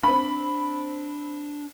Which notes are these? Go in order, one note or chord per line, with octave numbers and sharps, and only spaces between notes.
C4 D4 B5